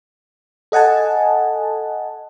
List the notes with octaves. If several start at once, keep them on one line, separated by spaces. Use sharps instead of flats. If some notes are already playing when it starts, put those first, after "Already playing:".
A4 D#5 F#5 G#5 A5